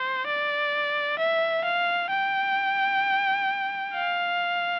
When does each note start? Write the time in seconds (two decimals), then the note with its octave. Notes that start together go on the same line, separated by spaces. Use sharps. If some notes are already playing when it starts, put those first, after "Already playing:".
Already playing: C5
0.27 D5
1.18 E5
1.64 F5
2.10 G5
3.94 F5